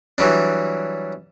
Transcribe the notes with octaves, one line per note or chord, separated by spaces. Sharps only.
E3 F#3 G3 D4